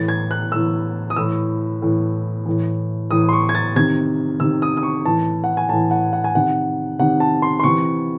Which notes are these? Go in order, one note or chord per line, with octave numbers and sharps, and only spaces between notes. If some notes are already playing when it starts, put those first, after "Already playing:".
Already playing: A2 E3 A6
G#6
F#6
A2 E3 E6
D#6
A2 E3 E6
A2 E3
A2 E3
A2 E3 D#6
C6
C#6
G#6
A6
C3 D#3 G#6
C3 D#3 E6
D#6
D#6
C#6
A2 E3 A5
F#5
G#5
A2 E3 A5
F#5
F#5
G#5
C3 D#3 F#5
C3 D#3 F#5
A5
C6
C6
C3 E3 C#6